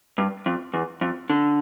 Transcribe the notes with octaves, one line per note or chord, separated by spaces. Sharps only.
G2
F2
E2
F2
D3